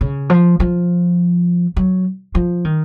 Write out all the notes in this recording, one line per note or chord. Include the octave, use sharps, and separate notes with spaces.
C#3
F3
F3
F#3
F3
D#3